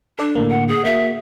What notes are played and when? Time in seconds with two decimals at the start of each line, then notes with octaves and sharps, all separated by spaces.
0.19 D4 A4 D5
0.35 A2 D3 A#3
0.50 F#5
0.68 G#4
0.85 A#3 F#4 E5